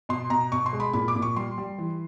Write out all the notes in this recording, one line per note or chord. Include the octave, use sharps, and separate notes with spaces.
B2 C6
B2 A#5
B2 C#6
C6
G#3
B5
A#2 B5
D6
A#2
C#6
G3 C6
G3
E3